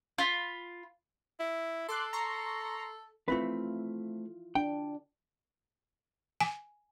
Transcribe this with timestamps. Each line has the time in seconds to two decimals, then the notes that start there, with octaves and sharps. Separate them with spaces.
0.18 F4 B5
1.40 E4
1.88 A4 C6 D6 F#6
2.13 A#5 C6 C#6
3.28 A3 C4 E4 F4 B4
4.55 D4 G5
6.40 G#5